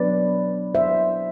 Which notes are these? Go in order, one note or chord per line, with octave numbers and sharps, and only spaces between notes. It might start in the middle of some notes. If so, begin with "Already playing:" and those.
Already playing: F#3 B3 D4 B4 D5
C5 E5